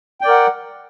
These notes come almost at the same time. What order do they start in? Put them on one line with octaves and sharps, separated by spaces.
G5 D5 A#4 F#5